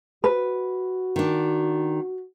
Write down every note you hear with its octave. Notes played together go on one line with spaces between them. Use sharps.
F#4 B4
D#3 D4